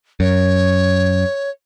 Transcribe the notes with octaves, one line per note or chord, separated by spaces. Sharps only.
F#2 C#5